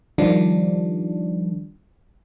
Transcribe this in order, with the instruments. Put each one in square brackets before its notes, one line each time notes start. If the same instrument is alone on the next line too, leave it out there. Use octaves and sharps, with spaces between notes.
[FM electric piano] D#3 F3 G3 D4